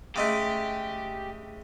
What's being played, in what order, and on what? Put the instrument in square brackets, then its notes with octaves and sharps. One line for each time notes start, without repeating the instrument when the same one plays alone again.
[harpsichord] C#3 G#3 A3 [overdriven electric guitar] G4